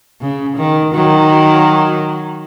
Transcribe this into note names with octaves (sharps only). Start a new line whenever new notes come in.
C#3
D#3
D#3 F#3